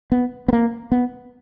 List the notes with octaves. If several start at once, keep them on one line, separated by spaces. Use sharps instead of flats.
B3
B3
A#3
B3